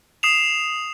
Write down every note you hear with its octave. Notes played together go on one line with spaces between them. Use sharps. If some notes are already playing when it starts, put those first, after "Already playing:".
D#6 C7 E7 F7